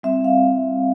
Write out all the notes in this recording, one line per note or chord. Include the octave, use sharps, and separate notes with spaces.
G3 C4 E4 E5
F5